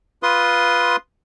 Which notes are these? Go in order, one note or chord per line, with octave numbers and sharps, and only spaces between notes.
F4 B4 C6 D#6